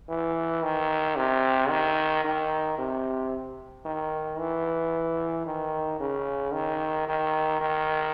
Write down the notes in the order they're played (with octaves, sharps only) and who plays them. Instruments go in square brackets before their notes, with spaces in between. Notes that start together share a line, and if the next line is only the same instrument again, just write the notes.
[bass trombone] E3
D#3
C3
D#3
D#3
C3
D#3
E3
D#3
C#3
D#3
D#3
D#3